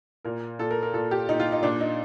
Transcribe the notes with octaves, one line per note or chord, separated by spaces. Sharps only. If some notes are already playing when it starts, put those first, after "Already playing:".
A#2 A#4
A#2 A4
A#4
A#4
A#2 A4
G4
A#2 D#4
F4
D#4
A#2 D4
D#4